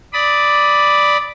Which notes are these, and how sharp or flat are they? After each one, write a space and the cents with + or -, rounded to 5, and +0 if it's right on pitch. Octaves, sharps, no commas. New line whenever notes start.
D5 +0 B5 +0 D#6 +25